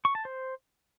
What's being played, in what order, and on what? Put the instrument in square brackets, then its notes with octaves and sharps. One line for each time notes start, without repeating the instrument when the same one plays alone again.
[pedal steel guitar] C#6
A5
C5